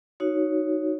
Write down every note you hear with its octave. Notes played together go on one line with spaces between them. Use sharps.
D#4 F#4 C#5